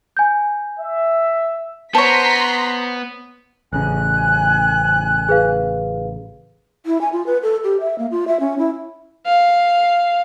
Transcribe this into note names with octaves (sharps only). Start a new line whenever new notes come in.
G#5 G6
E5
B3 C5 C#5 A5 A#5 C6 B6
A1 C#3 G#5 F#6
G#4 B4 F5
E4
G#5
F4
B4
A4
G4
E5
A#3
F4
E5
C#4
E4
F5